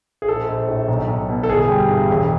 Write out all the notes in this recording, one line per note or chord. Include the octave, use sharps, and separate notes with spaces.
G#4
A#1 A4
A#1
A2
B1
B1
B2
A4
G1 G#4
G3
G2
E1